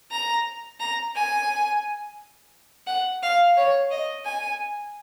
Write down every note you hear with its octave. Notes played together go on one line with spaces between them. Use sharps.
A#5
A#5
G#5
F#5
F5
C#5
D#5
G#5